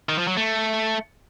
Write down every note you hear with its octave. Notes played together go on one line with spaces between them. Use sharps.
D#3
F3
F#3
A3